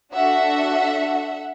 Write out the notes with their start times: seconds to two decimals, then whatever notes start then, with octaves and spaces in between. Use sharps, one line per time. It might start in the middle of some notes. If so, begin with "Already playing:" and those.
0.14 D4 F#4 A4 E5 F#5